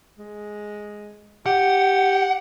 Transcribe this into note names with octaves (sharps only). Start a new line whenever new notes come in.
G#3
G4 F#5